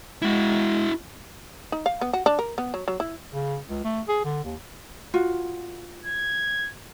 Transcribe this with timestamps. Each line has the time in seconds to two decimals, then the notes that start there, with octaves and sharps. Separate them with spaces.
0.22 G#3 E4 F#4
1.72 D#4
1.86 F5
2.01 B3
2.13 F#4
2.26 D4
2.39 A#4
2.58 B3
2.74 F#3
2.88 F#3
3.00 E4
3.32 C#3
3.69 C#2
3.84 A3
4.08 G#4
4.25 D3
4.44 D#2
5.14 F4 F#4
6.05 G#6